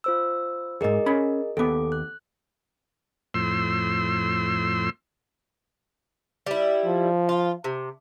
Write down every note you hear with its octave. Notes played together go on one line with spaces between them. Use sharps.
F4 C5 E6
E2 G#2 G#4 A#4 D#5
C#4 B5
D#2 B3 A4 D6
F#6
F2 A2 C6 E6
G3 E4
F3
F4
C3